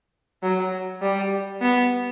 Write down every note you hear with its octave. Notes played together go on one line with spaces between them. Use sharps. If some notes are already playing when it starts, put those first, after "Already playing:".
F#3
G3
B3